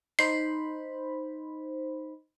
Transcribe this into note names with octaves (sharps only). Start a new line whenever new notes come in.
D#4 C5 B5 C7